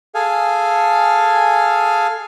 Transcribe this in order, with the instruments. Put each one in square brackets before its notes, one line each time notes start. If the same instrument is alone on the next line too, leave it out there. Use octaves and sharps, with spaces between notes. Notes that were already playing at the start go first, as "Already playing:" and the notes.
[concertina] G#4 A4 F5 G#5